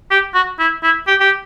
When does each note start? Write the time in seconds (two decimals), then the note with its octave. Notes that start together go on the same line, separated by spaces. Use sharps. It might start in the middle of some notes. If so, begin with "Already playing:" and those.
0.11 G4
0.34 F#4
0.59 E4
0.83 E4
1.07 G4
1.20 G4